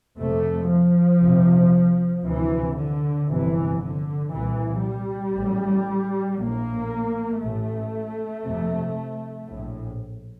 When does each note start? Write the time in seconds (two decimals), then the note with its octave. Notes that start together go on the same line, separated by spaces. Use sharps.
0.18 F1 F2 C3 A3
0.69 F3
1.21 F1 F2 C3
2.24 D2 C3 E3
2.75 D3
3.28 G1 F2 C3 E3
3.79 D3
4.31 C2 A#2 E3
4.82 G3
5.34 A1 A2
6.37 A#1 A2 A#3
7.41 A1 A2 A3
8.43 F1 F2 C3
9.48 A#1 A2